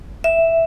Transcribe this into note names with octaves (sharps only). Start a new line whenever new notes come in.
E5